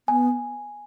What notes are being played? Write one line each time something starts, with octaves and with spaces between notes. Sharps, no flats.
B3 G#5